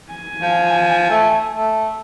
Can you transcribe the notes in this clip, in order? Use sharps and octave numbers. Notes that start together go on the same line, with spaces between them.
G#5
F3
A3
A3